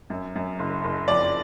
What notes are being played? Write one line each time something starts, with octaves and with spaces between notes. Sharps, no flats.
F#2
F#2
F#1
F#1
F2 D5